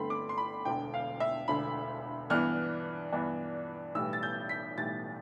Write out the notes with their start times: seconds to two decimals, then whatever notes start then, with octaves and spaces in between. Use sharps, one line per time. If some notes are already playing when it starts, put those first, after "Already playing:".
Already playing: G2 D3 A3 C4 B5 C6
0.10 D6
0.29 C6
0.38 B5
0.65 E1 D2 D3 G5
0.94 F5
1.20 E5
1.48 E1 D2 D3 B5
2.30 G2 E3 B3 D4 F6
3.12 G2 E3 B3 D4
3.95 B1 A2 E3 G3 E6
4.13 A6
4.23 G6
4.49 B6
4.78 B1 A2 E3 G3 A6